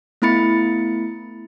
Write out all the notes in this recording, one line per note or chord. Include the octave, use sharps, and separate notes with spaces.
A3 B3 E4 B5 A6 C#7